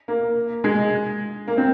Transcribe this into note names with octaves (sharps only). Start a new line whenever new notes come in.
A#3
G#3
A#3
C4